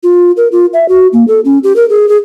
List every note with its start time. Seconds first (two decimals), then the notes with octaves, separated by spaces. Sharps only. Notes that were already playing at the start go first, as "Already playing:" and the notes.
0.03 F4
0.37 A#4
0.52 F4
0.73 E5
0.89 F#4
1.13 A#3
1.28 A4
1.45 C#4
1.64 G4
1.76 A#4
1.90 G#4
2.09 G#4